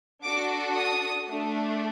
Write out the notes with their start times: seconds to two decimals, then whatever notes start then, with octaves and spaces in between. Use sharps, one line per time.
0.23 D4 F#4 A4 D6
0.75 D#6
1.29 A3 D4